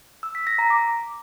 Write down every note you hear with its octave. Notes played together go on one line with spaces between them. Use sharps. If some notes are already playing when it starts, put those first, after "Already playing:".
E6
B6
A#6
A#5
D6